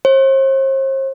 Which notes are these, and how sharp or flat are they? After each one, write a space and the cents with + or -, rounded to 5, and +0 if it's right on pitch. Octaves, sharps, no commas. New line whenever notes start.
C5 +40